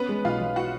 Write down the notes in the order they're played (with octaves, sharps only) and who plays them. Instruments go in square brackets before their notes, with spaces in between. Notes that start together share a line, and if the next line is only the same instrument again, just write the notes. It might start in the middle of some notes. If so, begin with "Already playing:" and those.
Already playing: [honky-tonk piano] B3 B4 [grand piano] C#4
[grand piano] G#3
[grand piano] B1 [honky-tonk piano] F4 F5
[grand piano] B1
[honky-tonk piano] F#4 F#5